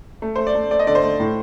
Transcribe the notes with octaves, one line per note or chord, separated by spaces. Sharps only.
A3
A3 C5
D5
A3
A3 D5
D#5
D3 D5
C5
A3
A2